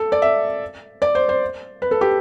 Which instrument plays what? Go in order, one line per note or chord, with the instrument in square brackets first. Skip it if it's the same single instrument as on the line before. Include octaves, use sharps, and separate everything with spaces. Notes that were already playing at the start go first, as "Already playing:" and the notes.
Already playing: [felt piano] A4
D5
E5
D5
C5
C5
B4
A4
G4